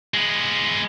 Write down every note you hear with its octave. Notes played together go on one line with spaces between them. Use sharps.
G#3 B3